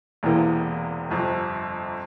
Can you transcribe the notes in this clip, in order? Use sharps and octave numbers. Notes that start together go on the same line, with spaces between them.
E1 E2 C3 E3 A#3
G1 F2 C3